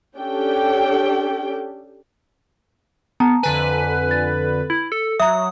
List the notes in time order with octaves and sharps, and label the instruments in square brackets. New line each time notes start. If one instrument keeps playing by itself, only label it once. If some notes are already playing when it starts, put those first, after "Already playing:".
[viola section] C#4 D4 G4 A4 G5
[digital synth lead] B3 [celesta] A5 A#5
[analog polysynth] F2 D3 B4 [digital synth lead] G#5
[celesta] A6
[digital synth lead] E4
A4
[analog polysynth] F#3 [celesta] E5 A#5 [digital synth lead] D#6